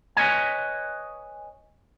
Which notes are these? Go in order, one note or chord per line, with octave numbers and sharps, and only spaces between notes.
B4 C#5 D#5 G#5